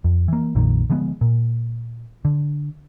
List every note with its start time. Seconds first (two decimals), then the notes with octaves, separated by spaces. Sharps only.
0.04 F2
0.28 E3 A#3
0.55 A#1 F2 A#2 D#3
0.90 D3 F3 G#3 B3
1.21 A#2
2.25 D3